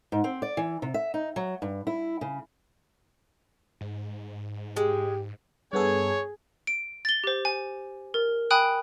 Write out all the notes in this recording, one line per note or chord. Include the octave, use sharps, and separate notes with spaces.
G#2
C4
D5
E3
C3
E5
D#4
F#3
G2
E4
C#3
G#2
G#3 G4
G2 B3 G#4 A4 C#5
D7
A6 G7
G4 C5
G#5
A#4
G5 G#5 B5 D#6 F#6 D7